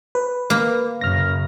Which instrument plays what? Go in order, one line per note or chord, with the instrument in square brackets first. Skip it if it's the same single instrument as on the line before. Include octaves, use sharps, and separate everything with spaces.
[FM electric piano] B4
[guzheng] A#3
[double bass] F#2 C#3 [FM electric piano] F6 A#6